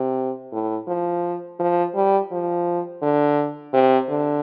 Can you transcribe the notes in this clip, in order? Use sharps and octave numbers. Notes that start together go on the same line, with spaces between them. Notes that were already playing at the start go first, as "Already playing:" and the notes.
Already playing: C3
A2
F3
F3
G3
F3
D3
C3
D3